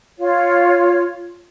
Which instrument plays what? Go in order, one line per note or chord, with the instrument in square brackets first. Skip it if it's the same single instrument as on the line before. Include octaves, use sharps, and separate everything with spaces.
[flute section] F4 C#5